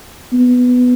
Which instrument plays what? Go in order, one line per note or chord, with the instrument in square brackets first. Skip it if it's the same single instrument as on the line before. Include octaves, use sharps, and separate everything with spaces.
[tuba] B3